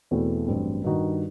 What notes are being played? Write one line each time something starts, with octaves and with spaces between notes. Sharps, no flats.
E2 B2 A3 C4 E4
A1 G2 F#3 C4
G2 D#3 G3 D#4 F#4